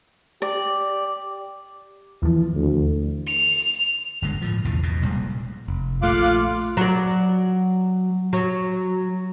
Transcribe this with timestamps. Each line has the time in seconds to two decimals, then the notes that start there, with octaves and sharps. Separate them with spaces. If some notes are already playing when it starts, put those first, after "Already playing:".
0.42 G4 D5
2.23 D#2 E3 F3
2.55 D2
3.27 F7
4.22 G1 D3 G#3
4.42 A2 F3
4.64 B1 E2 A2 C#3
4.83 E2 B2
5.02 F1 A#2 G3 G#3
5.68 F1
6.02 A#1 A3 F4 F5 D6 F#6
6.77 F#3 D5
8.33 F#3